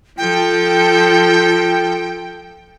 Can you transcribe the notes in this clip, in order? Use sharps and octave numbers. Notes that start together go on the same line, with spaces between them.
F3 A4 G5